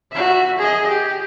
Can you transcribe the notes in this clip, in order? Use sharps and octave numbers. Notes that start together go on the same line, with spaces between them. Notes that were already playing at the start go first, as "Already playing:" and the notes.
F#4 E5
G#4 D#5
G4